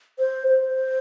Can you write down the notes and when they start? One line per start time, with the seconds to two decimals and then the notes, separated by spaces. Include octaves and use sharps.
0.19 C5
0.48 C5